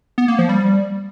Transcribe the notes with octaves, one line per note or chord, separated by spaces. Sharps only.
B3
A#3
F3
G3